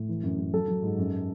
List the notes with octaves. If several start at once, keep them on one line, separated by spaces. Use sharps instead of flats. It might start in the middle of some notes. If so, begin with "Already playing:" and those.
Already playing: A2
E3
F#2
F#2
F#3 A4
F#3
G#2
F#2